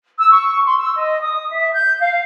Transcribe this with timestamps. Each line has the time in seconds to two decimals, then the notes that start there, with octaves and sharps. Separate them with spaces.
0.18 E6
0.31 C#6
0.65 C6
0.78 E6
0.97 D#5
1.22 D#6
1.51 E5
1.73 G6
1.99 F5